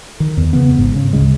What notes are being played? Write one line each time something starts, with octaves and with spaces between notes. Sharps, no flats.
D#3
E2
C#3 E3 B3
G#1 G#2
C#3
D2 C#3 G#3